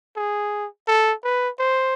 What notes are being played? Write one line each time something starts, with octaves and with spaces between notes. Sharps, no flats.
G#4
A4
B4
C5